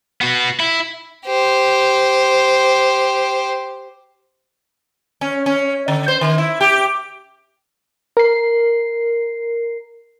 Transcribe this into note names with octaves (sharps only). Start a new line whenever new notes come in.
B3 F#4
E4
G4 C5
C#4
C#4
D3
C5
D#3
E4
G4
A#4 C7